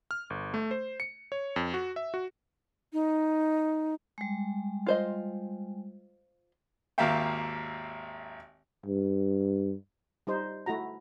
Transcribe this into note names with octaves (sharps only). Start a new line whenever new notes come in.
F6
G1
A3
C5
C#7
C#5
F2
F#4
E5
F#4
D#4
G3 G#3
F4 C5 D#5
G#1 D#2 A#3 E5 F5 G5
G2
G3 D#4 C5
A3 E4 F#4 A#5